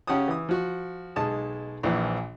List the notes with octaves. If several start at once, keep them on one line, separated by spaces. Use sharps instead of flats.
C#3 C#4 G4 F#5 A5 D#6
E3 D#6
F3 F#4
B1 G#3 A5 D#6
A#1 A#2 E3 F3